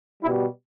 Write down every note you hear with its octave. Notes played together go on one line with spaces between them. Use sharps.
B2 G3 E4